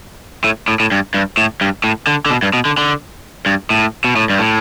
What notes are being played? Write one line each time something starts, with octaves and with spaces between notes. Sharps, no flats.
A2
A2
A2
G2
G2
A2
G2
A2
D3
D3
B2
G2
B2
D3
D3
G2
A2
B2
A2
G2
A2